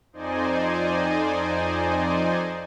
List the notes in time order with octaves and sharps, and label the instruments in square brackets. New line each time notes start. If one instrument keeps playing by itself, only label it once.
[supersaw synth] F2 D#4 C5 D5 D#5 G#5